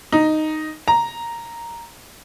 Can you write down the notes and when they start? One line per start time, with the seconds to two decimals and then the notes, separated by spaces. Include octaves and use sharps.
0.12 D#4
0.88 A#5